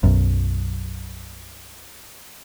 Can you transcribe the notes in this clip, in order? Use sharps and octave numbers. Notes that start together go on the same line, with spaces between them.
B1 F#2